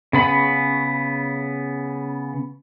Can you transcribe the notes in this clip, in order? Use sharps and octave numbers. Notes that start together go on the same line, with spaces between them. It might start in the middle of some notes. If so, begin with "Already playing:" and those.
C#3 B3 B5